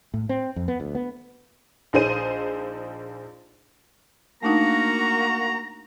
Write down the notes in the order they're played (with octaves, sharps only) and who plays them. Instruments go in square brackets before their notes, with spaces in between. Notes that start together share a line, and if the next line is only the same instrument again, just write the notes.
[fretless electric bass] A2
C4
F2
B3
D2
B3
[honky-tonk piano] A#1 D#4 G#4 C5 D#7
[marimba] A3 D4 D#4 [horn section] A#3 F#4 [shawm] A#5